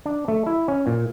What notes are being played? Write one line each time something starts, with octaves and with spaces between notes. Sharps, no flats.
D4
A3
E4
C#4
A#2